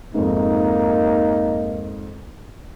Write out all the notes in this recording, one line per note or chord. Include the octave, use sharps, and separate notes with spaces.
F2 G#2 A#3 D#4